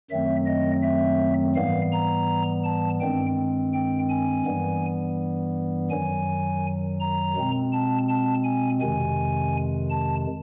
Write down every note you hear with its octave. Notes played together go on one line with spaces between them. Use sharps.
F#2 D#3 F#3 A3 C4 E5
D#5
E5
G#2 E3 G3 B3 F5
A#5
A5
G2 D#3 G#3 C4 G5
G5
G#5
G2 E3 G3 B3
F#2 D#3 F#3 G#5
A#5
B2 G#3 C4
A5
A5
G#5
F2 C3 D#3 G#3 G#5
A5